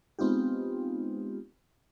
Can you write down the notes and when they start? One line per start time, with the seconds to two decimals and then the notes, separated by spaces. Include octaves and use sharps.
0.19 G#3 B3 C4 D#4 F4 G4